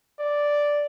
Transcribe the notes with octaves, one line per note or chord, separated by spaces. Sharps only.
D5